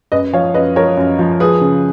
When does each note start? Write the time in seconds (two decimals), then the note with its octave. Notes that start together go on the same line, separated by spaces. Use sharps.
0.12 F#2 B4 D#5
0.33 F3 C#5 F5
0.54 F#2 B4 D#5
0.76 F3 A#4 C#5
0.97 F#2
1.19 F3
1.40 F3 G#4 B4
1.61 C#3